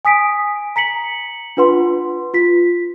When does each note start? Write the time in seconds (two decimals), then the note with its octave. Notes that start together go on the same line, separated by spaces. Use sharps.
0.05 G#5 D#6 B6 D7
0.76 A#5 B6 C#7 F#7
1.57 D4 F4 B4 F#5 C6
2.34 F4 B6